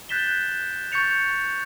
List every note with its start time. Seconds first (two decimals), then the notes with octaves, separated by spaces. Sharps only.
0.09 F#6 G6 A6 B6 E7 G7
0.92 C#6 G6 A6 C#7 F7